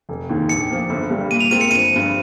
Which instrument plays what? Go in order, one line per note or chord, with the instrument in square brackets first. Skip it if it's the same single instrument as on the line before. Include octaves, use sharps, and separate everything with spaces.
[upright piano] F1
D#2 D#3
[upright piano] A#1 [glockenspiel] C#7
[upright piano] A#2 F3 A#3
G1
G2 G3
[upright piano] A#2 [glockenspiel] D#7
[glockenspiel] F7
[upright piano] G#3 C4 F4 A#4 [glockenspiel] D#7
[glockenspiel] C#7
[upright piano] G1 [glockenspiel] D#7
[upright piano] G2 F3